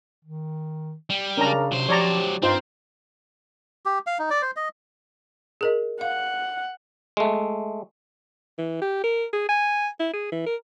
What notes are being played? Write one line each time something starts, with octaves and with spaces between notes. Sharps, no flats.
D#3
G3
C#3 C#4 D4 A#4 A#5
C3 F#3 C5
F3 G4 C#5 D5 A#5
G2 C4 D#4 F4 C5
G4
F5
D#4
D5
C5
D#5
G#4 A#4 D#5
F5 F#5
G#3 A3
E3
G4
A#4
G#4
G#5
E4
G#4
E3
A#4